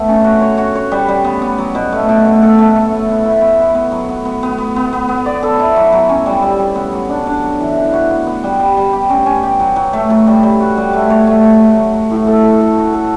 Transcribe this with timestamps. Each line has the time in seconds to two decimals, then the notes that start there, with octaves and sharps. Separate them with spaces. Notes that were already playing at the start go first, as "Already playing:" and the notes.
Already playing: A3 B3
0.09 C#4
0.24 F#4
0.41 C#5
0.58 F#4
0.75 C#5
0.92 G3
1.08 G3
1.24 B3
1.42 B3
1.58 F#3
1.75 B2
1.92 A3
2.09 B2
2.25 A3
2.42 A4
2.59 A3
2.75 A3
2.91 E4
3.09 B3
3.25 E4
3.42 B3
3.59 B3
3.75 B3
3.92 F#3
4.09 B3
4.25 B3
4.43 B3
4.58 B3
4.76 B3
4.93 B3
5.09 B3
5.26 D5
5.43 A4
5.59 E4
5.76 F#3
5.92 F#3
6.09 C#4
6.26 G3
6.42 G3
6.59 G3
6.75 B3
6.93 F#3
7.09 D4
7.27 D4
7.43 F#3
7.60 E3
7.77 E3
7.93 F#4
8.10 B3
8.27 B3
8.43 G3
8.60 G3
8.77 G3
8.93 G4
9.10 C#4
9.26 C#4
9.43 G4
9.60 F#3
9.76 F#3
9.93 A3
10.10 F#3
10.27 G3
10.43 G3
10.60 F#4
10.77 G3
10.93 A3
11.10 C#5
11.27 A3
11.44 C#5
11.61 A3
11.77 F#3
11.93 F#3
12.11 A2
12.27 A4
12.44 A4
12.60 A4
12.78 F#4
12.94 A4